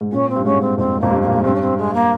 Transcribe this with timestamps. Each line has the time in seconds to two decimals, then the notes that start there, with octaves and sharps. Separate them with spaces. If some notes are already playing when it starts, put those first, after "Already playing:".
0.01 G#2
0.12 A#2 C#4
0.29 C4
0.35 G2
0.45 G#2 C#4
0.61 C4
0.78 F2 C4
1.00 F2 A#3
1.10 G2
1.21 A#2 A#3
1.36 G#2
1.43 G2 C4
1.55 C#4
1.60 C4
1.77 G#3
1.94 A#3